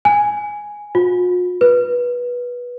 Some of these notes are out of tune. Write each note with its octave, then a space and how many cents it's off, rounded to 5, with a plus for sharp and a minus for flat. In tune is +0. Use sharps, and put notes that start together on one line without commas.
G#5 +0
F4 +45
B4 -15